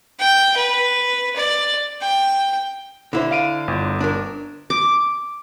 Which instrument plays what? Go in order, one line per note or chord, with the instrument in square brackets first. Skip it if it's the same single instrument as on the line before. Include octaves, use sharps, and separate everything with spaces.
[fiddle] G5
B4
D5
G5
[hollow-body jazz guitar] D3 E4 C5
[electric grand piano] F5 D7 D#7
G1
[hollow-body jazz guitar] D4 A#4
[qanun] D6